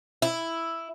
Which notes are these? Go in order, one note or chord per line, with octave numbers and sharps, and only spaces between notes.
E4